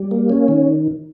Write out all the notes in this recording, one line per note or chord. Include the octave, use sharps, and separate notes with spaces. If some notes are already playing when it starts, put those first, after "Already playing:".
Already playing: G3
A#3
C#4
D#3